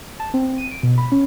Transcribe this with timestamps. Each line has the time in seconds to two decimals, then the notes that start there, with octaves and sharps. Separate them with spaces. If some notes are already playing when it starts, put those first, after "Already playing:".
0.20 A5
0.34 C4
0.58 D#7
0.71 D7
0.83 B2
0.98 B5
1.12 C#4